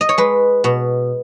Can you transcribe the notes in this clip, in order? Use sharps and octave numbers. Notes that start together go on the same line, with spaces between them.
D#5
C#5
G#3 B4
B2